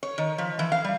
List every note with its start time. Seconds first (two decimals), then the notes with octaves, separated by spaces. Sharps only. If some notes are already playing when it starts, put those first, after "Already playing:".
0.03 C#5
0.18 D#3
0.38 F3
0.59 E3
0.72 F5
0.84 G3